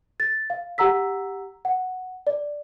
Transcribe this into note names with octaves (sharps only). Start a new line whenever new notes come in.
A6
F5
G4 F#5 A#5 E6 B6
F#5
D5